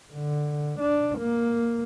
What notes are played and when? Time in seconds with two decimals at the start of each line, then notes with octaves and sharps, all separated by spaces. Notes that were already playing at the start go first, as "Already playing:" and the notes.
0.13 D3
0.79 D4
1.19 A#3